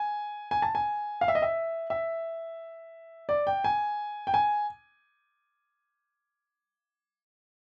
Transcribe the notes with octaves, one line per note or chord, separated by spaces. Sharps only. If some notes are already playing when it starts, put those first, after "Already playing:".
Already playing: G#5
G#5
A5
G#5
F5
E5
D#5
E5
E5
D5
G5
G#5
G5
G#5